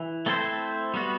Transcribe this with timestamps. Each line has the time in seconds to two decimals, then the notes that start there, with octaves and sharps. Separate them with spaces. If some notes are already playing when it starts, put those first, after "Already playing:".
Already playing: E3
0.26 A3 C4 E4 A4 C5
0.94 G3 B3 F#4